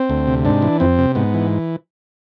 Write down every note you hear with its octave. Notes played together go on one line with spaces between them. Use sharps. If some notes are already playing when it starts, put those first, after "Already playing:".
Already playing: C4
D2
C3
G#2 D4
E3
F2 C4
C3
G#2 B3
E3